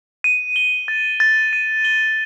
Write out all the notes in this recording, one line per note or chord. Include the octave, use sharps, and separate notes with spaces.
D#7
G7
A6
A6
D#7
G7